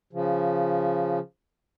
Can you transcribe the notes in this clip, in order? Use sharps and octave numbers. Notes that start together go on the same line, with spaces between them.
C#3 F3